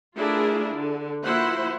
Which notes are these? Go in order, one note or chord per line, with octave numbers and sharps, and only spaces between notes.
A3 D4 E4 F4 G#4 A#4
D3
F3 A#3 E4 F#4 C5 F#5